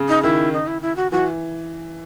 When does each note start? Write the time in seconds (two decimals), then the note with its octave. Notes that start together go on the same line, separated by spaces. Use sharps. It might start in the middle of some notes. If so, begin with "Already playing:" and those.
Already playing: C#3
0.09 D#4
0.23 D#3 E4
0.53 D#4
0.67 E4
0.82 E4
0.96 F#4
1.12 E3 F#4